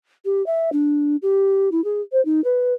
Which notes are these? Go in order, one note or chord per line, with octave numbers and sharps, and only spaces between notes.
G4
E5
D4
G4
E4
G#4
C5
D#4
B4